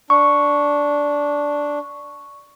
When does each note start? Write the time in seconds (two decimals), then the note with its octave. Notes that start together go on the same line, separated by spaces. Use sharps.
0.10 D4 C#6